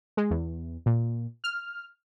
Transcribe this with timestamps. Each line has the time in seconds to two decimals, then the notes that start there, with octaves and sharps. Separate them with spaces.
0.17 G#3
0.31 E2
0.86 A#2
1.44 F6